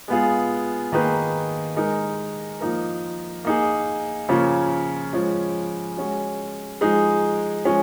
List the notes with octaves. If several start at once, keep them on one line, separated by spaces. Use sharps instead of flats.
G#3 B3 F4 G#4
D#3 A#3 D#4 G#4 B4
G#3 D#4 A#4
F3 A#3 D#4 A#4
A#3 D#4 G#4
C#3 F3 A#3 C#4 F4
F3 G#3 C#4
G#3 C#4 F#4
F3 G#3 D#4 G#4
F3 G#3 C#4